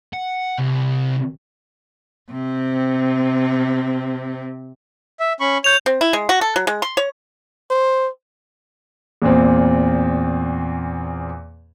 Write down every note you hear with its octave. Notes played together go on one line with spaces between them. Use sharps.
F#5
C2
C3 C4
E5
C#4 B5 C#6
C#5 G6 F7
C4
E4
G#3
F#4
A4
F#3
G#3
C6
C#5
C5
E2 A#2 C4